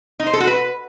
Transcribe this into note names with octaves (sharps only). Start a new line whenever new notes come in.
D#4
C5
A4
F#4
B4